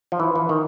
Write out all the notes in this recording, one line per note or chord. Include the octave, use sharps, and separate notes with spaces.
F3
E3
E3
D#3